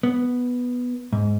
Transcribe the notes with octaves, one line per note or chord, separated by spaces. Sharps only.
B3
G#2